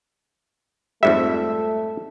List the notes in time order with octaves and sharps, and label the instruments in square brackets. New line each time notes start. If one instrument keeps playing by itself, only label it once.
[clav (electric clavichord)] F2 G#2 G3 [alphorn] A3 [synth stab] E5